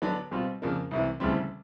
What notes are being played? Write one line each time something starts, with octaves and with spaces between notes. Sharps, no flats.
D3 F#3 B3 D4
B2 G3 C4 F4
F2 C#3 F3 A#3 D4
C2 C3 E3
D2 C#3 E3 G3 C4